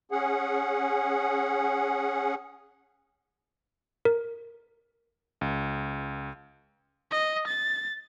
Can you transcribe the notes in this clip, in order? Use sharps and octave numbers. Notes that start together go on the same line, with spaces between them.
C#4 G#4 F#5
A#4
C#2
D#5
A6